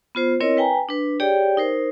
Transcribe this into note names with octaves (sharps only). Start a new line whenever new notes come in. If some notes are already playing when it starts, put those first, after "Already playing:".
B3 F4 C5
C4 E4 A#4 C#5 D#5
B4 G5 G#5 A#5
D4 B4
G4 G#4 C#5 D5 G5
D#4 A#4 C5